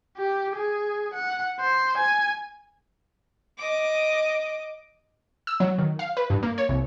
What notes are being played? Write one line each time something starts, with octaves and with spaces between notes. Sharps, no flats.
G4
G#4
F#5
C5
G#5
D#5 D6
E6
F#3
D#3
F5
B4
G2
A#3
C#5
C2